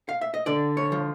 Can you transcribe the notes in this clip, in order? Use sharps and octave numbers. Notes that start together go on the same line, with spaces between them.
F5
E5
D#5
D3 D5
C#5
F3